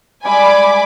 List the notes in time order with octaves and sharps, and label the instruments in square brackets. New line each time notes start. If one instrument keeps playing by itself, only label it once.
[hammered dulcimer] G3 G#3 E5 [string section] G#5 B5 D6